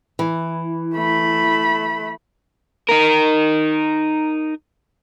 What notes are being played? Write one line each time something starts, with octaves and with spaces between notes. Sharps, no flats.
E3
A3 B5
D#4 A#4